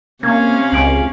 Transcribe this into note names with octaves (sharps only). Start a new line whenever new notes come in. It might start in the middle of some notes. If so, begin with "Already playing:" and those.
C3 A#3 C#4 F5 G#6
C#2 G#5 D7 F#7